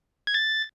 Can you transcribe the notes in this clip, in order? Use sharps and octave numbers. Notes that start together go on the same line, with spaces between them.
G#6
A6